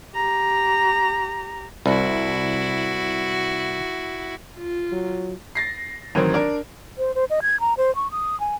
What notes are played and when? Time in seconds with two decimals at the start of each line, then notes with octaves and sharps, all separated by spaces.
0.14 G4 A#5
1.86 C2 E4 F#4
4.58 F4
4.92 F#3
5.55 A6 A#6 C7
6.15 A1 D#3 F#3 C4 A#4
6.34 D4 A#4 D5
6.98 C5
7.15 C5
7.30 D#5
7.42 G#6
7.60 A#5
7.78 C5
7.96 C#6
8.11 D#6
8.40 G#5